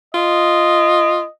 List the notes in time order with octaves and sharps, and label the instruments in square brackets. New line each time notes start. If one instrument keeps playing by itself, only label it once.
[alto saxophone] F4 [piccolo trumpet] D#5